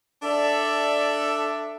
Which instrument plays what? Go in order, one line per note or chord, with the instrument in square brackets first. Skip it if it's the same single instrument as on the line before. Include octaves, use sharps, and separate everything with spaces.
[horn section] D4 A4 D5 E5